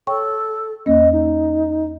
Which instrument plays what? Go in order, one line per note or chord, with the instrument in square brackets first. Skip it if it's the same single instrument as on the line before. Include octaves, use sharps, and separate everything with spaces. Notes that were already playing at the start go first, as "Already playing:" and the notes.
[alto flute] A4 [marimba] C#5 G5 C#6
[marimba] E2 A#3 C#4 [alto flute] D#5
[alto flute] D#4